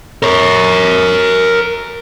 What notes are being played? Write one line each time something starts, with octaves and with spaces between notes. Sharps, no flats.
A#4 C#5